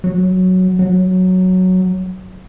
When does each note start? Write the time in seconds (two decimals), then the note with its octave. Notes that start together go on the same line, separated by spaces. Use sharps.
0.04 F#3
0.79 F#3